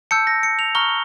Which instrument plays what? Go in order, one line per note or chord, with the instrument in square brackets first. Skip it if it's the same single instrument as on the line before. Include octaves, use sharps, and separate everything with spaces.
[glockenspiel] A5 E6 G6 C#7
A#6
C#7
F7
A#5 C#6 F6 G7